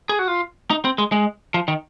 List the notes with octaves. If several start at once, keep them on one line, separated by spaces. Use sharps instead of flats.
G#4
F#4
F4
D#4
C4
G#3
G#3
F3
D#3